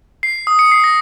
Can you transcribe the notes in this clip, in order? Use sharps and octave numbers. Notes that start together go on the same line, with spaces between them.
C7
D#6
C#7
C7
A#6